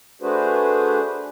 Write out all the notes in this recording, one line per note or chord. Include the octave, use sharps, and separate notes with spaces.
A3 D4 F#4 G#4 B4 C5